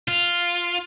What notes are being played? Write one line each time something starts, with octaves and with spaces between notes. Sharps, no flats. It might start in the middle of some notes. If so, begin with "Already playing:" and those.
F4